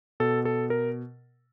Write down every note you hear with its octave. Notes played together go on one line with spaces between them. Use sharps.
B2 A4
A4
A#4